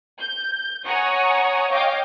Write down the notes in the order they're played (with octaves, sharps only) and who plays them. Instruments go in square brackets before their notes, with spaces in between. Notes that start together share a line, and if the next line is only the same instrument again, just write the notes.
[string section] G6
C#5 F#5 G#5 A#5 C#6 D#6
C#5 D#5 F5 G5 D6